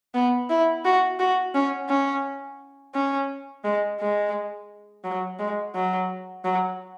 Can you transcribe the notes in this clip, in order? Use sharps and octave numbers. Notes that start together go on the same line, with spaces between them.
B3
E4
F#4
F#4
C#4
C#4
C#4
G#3
G#3
F#3
G#3
F#3
F#3